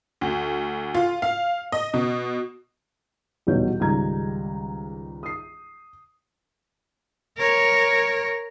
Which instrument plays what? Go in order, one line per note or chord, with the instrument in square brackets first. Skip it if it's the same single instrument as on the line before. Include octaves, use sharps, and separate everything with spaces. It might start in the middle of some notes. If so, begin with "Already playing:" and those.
[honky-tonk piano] D2
F4
F5
D#5
B2
[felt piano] D#1 E2 B2 F#3 C#5 G6
C#2 G#2 D#3 G3 A#5 G#6
D#6 C7
[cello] A#4 C#5